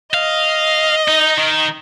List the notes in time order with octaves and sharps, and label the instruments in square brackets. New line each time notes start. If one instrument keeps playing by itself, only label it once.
[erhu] D#5 [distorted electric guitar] F5
[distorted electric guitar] D#4
D#3